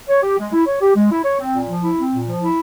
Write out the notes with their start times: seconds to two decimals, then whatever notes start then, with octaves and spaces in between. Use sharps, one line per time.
0.09 C#5
0.23 G4
0.38 G#3
0.53 E4
0.66 C#5
0.81 G4
0.95 G#3
1.10 E4
1.24 C#5
1.39 C4
1.53 A#2
1.68 F3
1.82 E4
1.96 C4
2.12 A#2
2.26 F3
2.40 E4